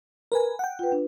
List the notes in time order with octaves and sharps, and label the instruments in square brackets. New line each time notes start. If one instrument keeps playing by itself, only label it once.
[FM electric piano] A#4 B4 G#5
F#5 G5
[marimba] F4 B4
D4